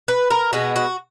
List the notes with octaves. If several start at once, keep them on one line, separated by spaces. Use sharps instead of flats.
B4
A#4
B2 G#3 B3 F#4
F#4